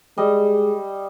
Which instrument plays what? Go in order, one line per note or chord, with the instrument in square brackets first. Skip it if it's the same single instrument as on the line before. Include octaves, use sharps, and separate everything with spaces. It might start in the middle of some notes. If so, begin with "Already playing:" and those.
[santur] G3 D#5 [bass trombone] G#3